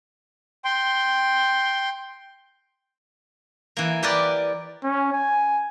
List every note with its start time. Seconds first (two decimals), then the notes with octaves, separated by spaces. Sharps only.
0.65 G5 C6
3.77 E3 A#3
4.03 G4 A#4 B4 D5
4.83 C#4
5.12 G#5